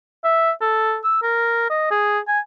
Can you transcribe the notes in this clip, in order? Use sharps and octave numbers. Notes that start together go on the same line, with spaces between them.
E5
A4
E6
A#4
D#5
G#4
G#5